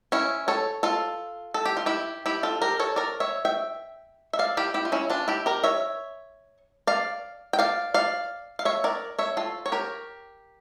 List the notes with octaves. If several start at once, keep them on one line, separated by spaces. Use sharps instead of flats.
C#4 E4
A4 C#5
F4 A4
A4
G4
F4
E4 G4
E4 G4
F4 A4
G4 A#4
A4 C#5
A#4 D5
C#5 E5
E5 G5
E5
D5 F5
E4 G4
E4 G4
F4
C#4 E4
D4 F4
E4 G4
G4 A#4
C#5 E5
D5 F5
G5
D5 F5
D5 F5
F5
C#5 E5
A#4 D5
C#5 E5
F4 A4
C#5
G4 A#4